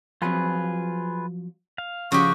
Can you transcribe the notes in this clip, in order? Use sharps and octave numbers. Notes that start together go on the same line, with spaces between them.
F3 F#3 C4 F4 G#4 B4
F5
C#3 F3 F#4 G4 C#6